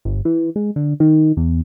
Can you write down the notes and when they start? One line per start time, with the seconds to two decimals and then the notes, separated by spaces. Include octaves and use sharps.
0.05 G1
0.25 E3
0.56 G#3
0.76 D3
1.00 D#3
1.37 E2